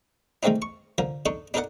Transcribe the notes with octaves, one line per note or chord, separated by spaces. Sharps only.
D#3 G#3 A3 C4 D4 D#4
C#6
D3 F3 A#4
D4 D#4 A4 C#6
D4 D#4 A4 A#4 D5 F#5